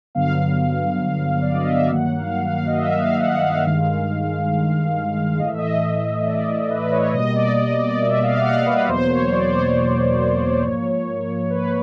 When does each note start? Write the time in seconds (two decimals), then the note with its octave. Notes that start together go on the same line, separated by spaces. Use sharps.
0.15 G2 D3 F#3 B3 F5
1.41 D5
1.53 D#5
1.65 E5
1.78 F5
1.89 G2 D#3 F#3 A#3 F#5
2.18 F5
2.48 F5
2.67 D#5
2.77 E5
2.99 F5
3.20 F#5
3.42 F5
3.64 G2 D#3 G#3
5.39 A2 E3 A3 D#5
5.48 E5
5.58 D#5
6.26 D5
6.70 B4
6.92 C#5
7.13 B2 G3 A#3 D#5
7.35 D5
7.57 D#5
7.79 D5
8.01 E5
8.23 F5
8.39 F#5
8.45 F5
8.66 B4
8.88 E2 B2 F#3 A#3 C5
9.10 C#5
9.32 D5
9.45 C5
9.54 C#5
10.63 G#2 F3 A#3
11.50 B4